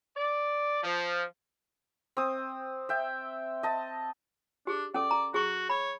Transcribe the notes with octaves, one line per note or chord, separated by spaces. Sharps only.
D5
F3
C4 D#6
E5 G5
D#5 A5
D4 G4 G#4
C#4 A4 D5
A#5
F#4 G#4 C#6
C#5 B5